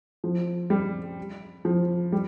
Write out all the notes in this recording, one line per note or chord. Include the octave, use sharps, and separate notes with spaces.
F3
G3
F3
G3